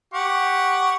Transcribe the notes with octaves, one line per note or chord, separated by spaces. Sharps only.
G4 F#5 C#6